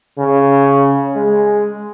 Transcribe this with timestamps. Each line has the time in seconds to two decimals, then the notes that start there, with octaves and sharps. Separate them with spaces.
0.18 C#3
1.16 G#3